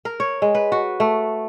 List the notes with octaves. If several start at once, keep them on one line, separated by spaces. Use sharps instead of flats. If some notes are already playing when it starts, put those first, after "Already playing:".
A#4
C#5
G#3
B4
F#4
A3